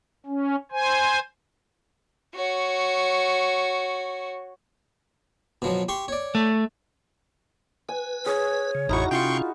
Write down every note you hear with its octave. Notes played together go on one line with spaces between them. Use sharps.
C#4
C5 G#5
F#4 C#5
B2 F3 F#3
G4 C6 C#6
C#5 D5
A3
B4 G#5
G#4 C#5
C#3
A1 F2 D#4 E4 F#4 A#5 C#6
C3 C#4 F4 G5 C6 C#6